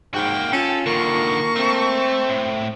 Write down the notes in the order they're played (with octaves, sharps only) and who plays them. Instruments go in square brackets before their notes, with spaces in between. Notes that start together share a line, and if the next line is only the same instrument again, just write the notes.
[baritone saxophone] G#2 [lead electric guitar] A#3 F#4 [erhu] G5
[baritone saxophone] C#4 [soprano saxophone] F4 [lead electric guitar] A4
[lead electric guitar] D3 D#3 [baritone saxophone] A#3 [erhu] C#6
[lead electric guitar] A3 A4 [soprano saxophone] C4
[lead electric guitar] A2